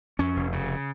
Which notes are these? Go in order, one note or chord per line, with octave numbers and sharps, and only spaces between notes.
F2 C#4
F1
C#3